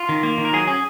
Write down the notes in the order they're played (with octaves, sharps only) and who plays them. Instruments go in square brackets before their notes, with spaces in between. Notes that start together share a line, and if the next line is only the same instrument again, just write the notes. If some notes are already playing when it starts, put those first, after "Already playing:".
Already playing: [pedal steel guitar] F4
D#3
A#3
D#3
A#4
F#3 G#4
C#4 G#4